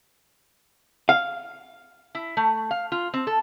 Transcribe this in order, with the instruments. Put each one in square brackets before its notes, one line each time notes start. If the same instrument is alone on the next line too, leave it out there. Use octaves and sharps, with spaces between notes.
[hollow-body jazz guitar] F5
[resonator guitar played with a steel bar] E4
A3
F5
F4
C4
A4